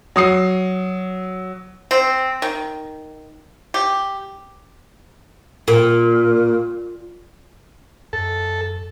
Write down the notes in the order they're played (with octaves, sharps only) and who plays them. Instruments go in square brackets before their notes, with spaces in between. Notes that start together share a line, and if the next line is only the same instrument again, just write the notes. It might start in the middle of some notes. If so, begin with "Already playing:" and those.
[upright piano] F#3 D#6 C7
[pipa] C4
D#3
G4
[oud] A#2
[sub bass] F#2 [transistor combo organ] A4